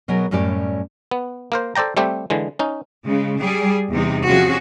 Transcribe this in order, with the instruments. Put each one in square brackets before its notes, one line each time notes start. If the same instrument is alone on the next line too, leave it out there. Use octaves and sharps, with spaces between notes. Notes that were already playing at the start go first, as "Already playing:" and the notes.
[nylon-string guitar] B2 F#3 B3 G#4 A#4
F#2 A2 G3 C#4 G4 D5
[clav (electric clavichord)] B3
A#3 A#4 C5
A4 C5 D5 G5 A#5
G3 A3 C4 G4
D3 E3 G#3
C#4 D#4
[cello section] C#3 G#3
G3 G#4
E2 C3 G3 D#4
C3 F3 C#4 F#4 G#4